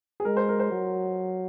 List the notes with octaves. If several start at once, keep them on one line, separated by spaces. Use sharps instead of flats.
G#4
G#3 A#4
C5
A#4
C5
F#3